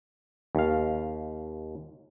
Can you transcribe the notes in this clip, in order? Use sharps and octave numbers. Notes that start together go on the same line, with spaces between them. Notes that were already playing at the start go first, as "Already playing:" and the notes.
D#2 F5